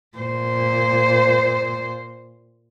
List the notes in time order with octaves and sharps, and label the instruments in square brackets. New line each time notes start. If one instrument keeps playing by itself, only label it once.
[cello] A#2 C5